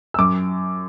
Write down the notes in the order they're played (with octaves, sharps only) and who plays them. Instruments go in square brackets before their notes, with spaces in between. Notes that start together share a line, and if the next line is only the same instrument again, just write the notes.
[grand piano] E6
F#2 D6